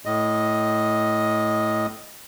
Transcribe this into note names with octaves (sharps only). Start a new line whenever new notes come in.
A2 D#5